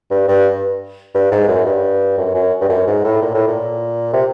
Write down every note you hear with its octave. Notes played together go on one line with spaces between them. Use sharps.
G2
G2
G2
G#2
F#2
G2
F#2
F#2
G2
F#2
G#2
A2
A#2
A2
A#2
C3